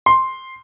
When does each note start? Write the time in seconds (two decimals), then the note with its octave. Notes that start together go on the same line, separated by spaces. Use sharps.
0.06 C6